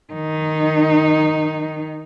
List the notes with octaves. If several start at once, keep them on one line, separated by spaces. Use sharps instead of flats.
D#3 D#4